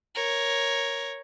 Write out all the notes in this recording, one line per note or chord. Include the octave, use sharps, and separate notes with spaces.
A#4 C#5